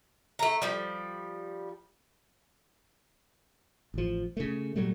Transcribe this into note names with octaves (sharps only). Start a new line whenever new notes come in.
A3 A#5
F3 G3
A1 F3
C#3 A3
A#2 F#3 G3 A3